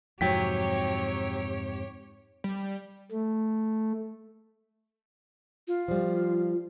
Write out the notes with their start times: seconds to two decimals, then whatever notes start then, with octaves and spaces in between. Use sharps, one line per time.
0.21 F2 G#2 C3 F#3 G4 C#5 G5 B6
2.44 G3
3.12 A3
5.68 F4
5.88 F3 G3